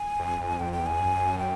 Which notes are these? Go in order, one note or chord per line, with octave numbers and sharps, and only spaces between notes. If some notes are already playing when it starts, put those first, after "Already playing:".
Already playing: G#5
F2
F2
F2 G5
G5
E2
G#5
F#2
G5